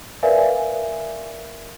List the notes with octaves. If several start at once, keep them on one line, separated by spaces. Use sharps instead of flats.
A#4 B4 D5 E5 F5 G#5